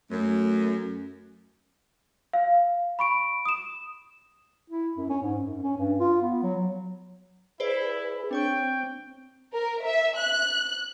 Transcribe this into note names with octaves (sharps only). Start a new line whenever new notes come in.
F#2 A3
F5
B5 C#6 D7
D#6 E7
E4
F#2
C#4
G#2
F#2
C#4
G2
F4
B3
F#3
F#3
E4 G#4 B4 C5 D5
C4 D4 C#5 G5 C#6
A#4
E5
F#6